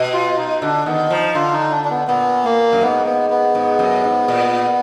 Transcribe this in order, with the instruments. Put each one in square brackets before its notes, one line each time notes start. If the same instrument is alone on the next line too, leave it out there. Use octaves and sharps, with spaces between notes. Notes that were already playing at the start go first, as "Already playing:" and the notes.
Already playing: [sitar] B2
[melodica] F4
D#4
[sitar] D3 [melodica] D4
[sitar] D#3 [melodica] B3
[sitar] F3 [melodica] D#4
[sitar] D3 [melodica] F4
[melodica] D#4
D4
D4
B3
[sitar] A#2 [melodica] B3
[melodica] A#3
[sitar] F#2
[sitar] G#2 [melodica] B3
[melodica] B3
B3
[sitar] G#2
F#2
G#2
A#2